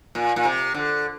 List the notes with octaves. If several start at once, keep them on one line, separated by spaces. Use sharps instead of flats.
A#2
A#2
C3
D3